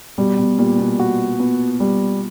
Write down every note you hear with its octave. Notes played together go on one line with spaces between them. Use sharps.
B2 G3
B2
A#2 G3
B2
F#4
B3
G3